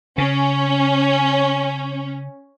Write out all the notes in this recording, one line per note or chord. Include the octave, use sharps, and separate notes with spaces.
C#3 C#4